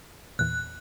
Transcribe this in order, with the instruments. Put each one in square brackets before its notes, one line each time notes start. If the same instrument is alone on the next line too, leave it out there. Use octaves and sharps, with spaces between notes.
[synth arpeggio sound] E2 A#2 [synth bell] F#6